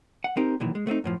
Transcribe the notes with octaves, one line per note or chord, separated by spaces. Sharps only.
F#5
C4 D#4 G4 A#4
B1 A#2 D#3 E3 F#3
G#3
A3 B3 C4 D#4
F#2 A2 F3